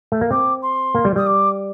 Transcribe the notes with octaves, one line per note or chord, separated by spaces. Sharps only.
A3
A#3
C4 D6
C6
A#3
G3
G3 D#6
D6